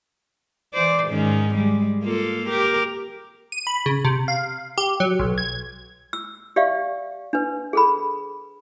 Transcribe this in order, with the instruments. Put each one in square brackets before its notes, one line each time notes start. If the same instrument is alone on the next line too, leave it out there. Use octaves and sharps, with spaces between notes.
[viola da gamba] E3 C5 D5
G#2 D#3 C#4
G3 G#3
A#3 F4 A4
G4 A#4
[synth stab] D#7
B5
C#3
C3
F5
G4
F#3
B1
G#6
[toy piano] E6
G4 D5 E5 F5 C#6
D4 B4
G#4 A4 B5